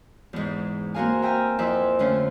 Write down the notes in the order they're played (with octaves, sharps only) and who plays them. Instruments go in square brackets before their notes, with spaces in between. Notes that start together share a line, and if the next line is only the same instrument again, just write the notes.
[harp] E2 G#2
A#3 C4 F#4 A#4 F5 G#5
E5 G5 G#5 A#5 F6
F2 C4 E4 E5
D3 A3 C#4 F4